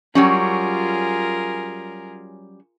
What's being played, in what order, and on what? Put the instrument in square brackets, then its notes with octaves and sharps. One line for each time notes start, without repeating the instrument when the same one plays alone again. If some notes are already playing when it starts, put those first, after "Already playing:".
[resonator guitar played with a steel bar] F#3 G3 C#4 [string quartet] F4 G#4 A#4